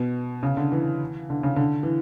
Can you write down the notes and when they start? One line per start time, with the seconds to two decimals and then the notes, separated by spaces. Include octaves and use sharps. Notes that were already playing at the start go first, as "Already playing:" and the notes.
Already playing: B2
0.43 C#3
0.57 D3
0.72 E3
1.30 D3
1.43 C#3
1.56 D3
1.83 E3